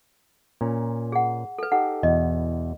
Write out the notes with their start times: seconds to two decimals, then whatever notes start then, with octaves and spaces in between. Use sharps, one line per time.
0.61 A#2 C#4 A#5
1.12 G#4 F#5
1.59 A4 B4
1.72 D#4 G4 A4 F#5
2.03 E2 B2 D#5